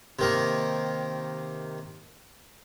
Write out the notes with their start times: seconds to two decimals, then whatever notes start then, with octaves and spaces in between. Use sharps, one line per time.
0.19 C3 D#3 A#3